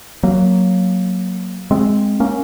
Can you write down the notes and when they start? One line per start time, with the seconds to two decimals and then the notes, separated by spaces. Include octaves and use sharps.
0.23 F#3 A#3
1.71 G#3 C4
2.20 A#3 C#4